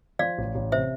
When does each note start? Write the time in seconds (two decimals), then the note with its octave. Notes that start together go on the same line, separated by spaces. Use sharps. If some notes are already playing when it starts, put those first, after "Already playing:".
0.19 F3 D5 F5
0.38 A1
0.55 A1
0.72 C3 C5 E5